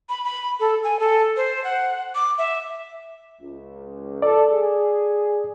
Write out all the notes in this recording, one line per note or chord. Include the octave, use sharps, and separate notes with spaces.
B5
B5
A4
G#5
A4
C5
F#5
D6
E5
C#2
A4 D5
G#4